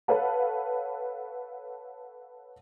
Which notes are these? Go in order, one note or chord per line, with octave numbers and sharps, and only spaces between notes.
A4 B4 C#5 F5 F#5 A5